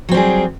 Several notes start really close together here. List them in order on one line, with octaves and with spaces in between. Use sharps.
F#3 C4 G3 G#4